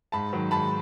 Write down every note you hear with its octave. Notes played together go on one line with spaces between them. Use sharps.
G#2 A5 B5
D#3 F#3
G#2 A5 B5